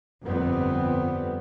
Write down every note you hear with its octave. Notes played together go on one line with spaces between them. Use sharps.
G1 F2 G3 B3 C4